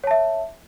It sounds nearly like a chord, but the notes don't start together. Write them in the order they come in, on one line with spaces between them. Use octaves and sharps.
C#5 A5 E5